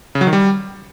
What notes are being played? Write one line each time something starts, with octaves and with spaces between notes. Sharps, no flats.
C#3
F#3
D#3
G3